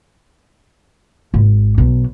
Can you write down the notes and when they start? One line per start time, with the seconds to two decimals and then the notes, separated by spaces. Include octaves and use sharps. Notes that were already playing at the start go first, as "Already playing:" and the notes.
1.34 G#1
1.78 B1